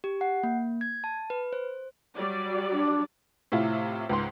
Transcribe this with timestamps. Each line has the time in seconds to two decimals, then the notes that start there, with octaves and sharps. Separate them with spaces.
0.04 G4
0.21 F#5
0.43 A#3
0.81 G#6
1.04 A5
1.30 B4
1.53 C5
2.15 F#3 G3 D5
2.72 D4
3.52 A2 C3 E4 F4
4.09 C#2 G#2 C6